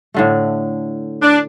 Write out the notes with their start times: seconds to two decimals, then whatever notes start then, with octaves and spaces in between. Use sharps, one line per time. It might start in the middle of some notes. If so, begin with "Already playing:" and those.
0.14 A2 D3 A3
1.22 D4